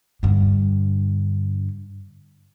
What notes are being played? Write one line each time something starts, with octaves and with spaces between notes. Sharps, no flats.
G2 D3